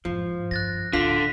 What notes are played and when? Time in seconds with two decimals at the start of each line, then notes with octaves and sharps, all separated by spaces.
0.05 F2 G#2 F3
0.51 G2 F#6 A6 A#6
0.93 A1 D2 D3 F4 B6